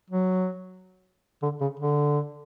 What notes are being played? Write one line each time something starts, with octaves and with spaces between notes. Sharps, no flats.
F#3
D3
C#3
D3